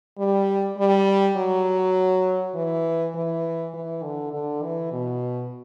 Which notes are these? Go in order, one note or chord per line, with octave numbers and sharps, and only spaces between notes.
G3
G3
F#3
E3
E3
E3
D3
D3
E3
B2